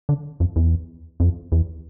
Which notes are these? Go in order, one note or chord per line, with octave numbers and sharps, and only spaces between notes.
D3
F2
E2
F2
E2